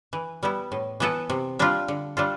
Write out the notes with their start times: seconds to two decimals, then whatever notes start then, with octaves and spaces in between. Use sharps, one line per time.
0.13 E3
0.43 G3 B3 E4
0.72 A2
1.00 E3 B3 E4 A4
1.30 C3
1.59 G3 D4 F4
1.88 D3
2.17 G3 D4 F4 A4